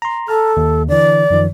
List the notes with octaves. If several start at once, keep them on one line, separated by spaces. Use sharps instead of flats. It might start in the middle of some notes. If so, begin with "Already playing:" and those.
A#5 C6
A4 A5 A#5 F6
D#2
D3 E3 D5
F#2 D#3 F3